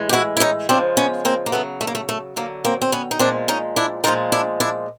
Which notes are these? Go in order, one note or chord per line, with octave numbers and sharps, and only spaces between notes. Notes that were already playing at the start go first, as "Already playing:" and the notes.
Already playing: A2 E3 G#3
G4
E4 F#4
E4
C#4 D#4
C#3 F3 G#3 C4 D4
B3 C#4
A#3 C4
A#3
C#3 F#3 A3 B3
A3
A#3
A3
A3
D3 F#3 A#3
A#3 C4
C4
B3 C#4
D#4
A#2 F3 G#3 C4 D4
C#4 D#4
D4 E4
A#2 F3 G#3 D#4 F4
D4 E4
D4 E4